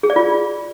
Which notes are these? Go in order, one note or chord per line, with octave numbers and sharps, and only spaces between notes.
G#4
D5
F4